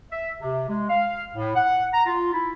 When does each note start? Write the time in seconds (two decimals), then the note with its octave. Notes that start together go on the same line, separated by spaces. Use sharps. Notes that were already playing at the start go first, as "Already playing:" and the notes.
0.12 E5
0.41 C3
0.69 G#3
0.90 F5
1.35 A2
1.56 F#5
1.94 A#5
2.06 F4
2.33 E4